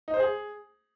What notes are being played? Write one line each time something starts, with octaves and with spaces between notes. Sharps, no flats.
D#4
C5
G#4